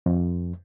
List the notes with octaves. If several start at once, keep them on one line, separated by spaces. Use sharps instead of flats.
F2